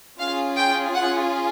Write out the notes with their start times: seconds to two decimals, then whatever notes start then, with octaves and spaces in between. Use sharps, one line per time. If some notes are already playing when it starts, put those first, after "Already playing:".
0.18 C#4 F4 G#4 F5
0.56 G5
0.94 F#5